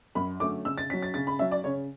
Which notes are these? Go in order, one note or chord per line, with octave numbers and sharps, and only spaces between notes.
F#2 B5
D3 F#3 A3 C#4 D6
C#3 E6
A6
F#3 C#4 B6
A6
C#3 A6
B5
F#3 C#4 E5
D5
C#3 C#5